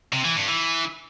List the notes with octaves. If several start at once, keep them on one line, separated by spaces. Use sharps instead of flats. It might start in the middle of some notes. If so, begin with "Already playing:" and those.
C3
E3
G2
E3